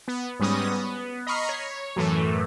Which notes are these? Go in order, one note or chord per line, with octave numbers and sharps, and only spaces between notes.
B3
G#2 G3 B3 C#4 D#6 A#6
B3
D#5 A#5 B5 C#6 F6 C7
C#5
F#2 A2 E3 A3